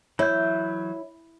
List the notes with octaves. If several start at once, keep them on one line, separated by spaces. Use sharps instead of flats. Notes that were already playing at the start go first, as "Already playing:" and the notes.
E3 F#3 E4 C#5 G6